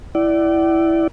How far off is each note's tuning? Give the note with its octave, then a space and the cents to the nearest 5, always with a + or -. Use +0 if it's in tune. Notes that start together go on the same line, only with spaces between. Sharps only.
E4 +0 D5 +0 F#5 +45